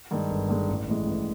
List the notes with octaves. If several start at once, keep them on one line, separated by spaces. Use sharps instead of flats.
G2 D#3 G#3
G1
G2 D#3 G#3
A1
A2 E3 G#3
A1